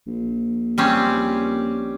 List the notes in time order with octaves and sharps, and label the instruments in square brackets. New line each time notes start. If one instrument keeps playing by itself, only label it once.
[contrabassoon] A#1
[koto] G3 C4 C#4